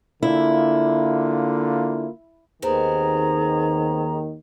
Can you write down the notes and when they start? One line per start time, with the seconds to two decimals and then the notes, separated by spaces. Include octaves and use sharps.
0.23 D3 A#3 E4 F4
2.62 D#2 D#3 B3 C4 G#4 A#5